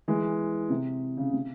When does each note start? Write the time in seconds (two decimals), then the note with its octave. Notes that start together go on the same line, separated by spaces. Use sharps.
0.08 E3 G#3
0.70 C3
1.17 C#3
1.33 C3